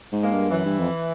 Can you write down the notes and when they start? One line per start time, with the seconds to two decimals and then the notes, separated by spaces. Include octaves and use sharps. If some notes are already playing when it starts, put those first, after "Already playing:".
0.12 G#2
0.22 G#3 A#3
0.32 G2
0.51 F#2 E3
0.65 G2
0.80 F2